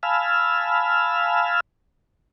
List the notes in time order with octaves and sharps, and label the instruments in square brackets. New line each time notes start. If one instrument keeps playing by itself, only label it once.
[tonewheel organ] F5 G#5 A5 B5 E6 F6